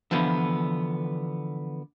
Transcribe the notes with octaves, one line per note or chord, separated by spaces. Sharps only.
D3 E3 F3 B3